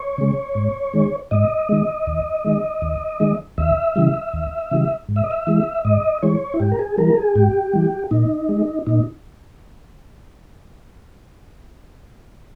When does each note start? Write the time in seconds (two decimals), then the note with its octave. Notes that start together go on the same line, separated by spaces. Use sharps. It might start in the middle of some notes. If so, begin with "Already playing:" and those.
Already playing: C#5
0.18 C#3 G#3
0.55 G#2
0.93 D#3 G#3
1.31 G#2 D#5
1.69 D#3 G#3
2.07 D#2
2.45 D#3 G#3
2.82 D#2
3.20 D#3 G#3
3.58 D#2 E5
3.96 C#3 E3 G3
4.33 D#2
4.71 C#3 E3 G3
5.09 G#2
5.16 E5
5.24 D#5
5.31 E5
5.47 E3 G#3
5.85 G#2 D#5
6.22 E3 G#3 C#5
6.54 E4
6.60 G#2 G4
6.71 A#4
6.79 G#4
6.98 E3 G3 A#4
7.17 G#4
7.35 G#2 G4
7.73 E3 G3
8.11 A#2 D#4
8.49 G#3
8.87 A#2 D#4